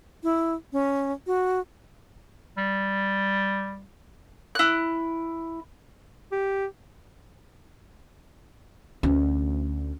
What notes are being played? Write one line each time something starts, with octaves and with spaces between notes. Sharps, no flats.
E4
C#4
F#4
G3
E4 F#6
G4
D2 C#4